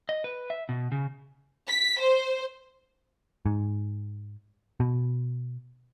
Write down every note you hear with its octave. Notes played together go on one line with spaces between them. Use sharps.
D#5
B4
E5
B2
C#3
B6
C5
G#2
B2